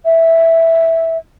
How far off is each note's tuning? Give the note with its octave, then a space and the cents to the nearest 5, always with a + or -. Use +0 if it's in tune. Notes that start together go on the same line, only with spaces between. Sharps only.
E5 -5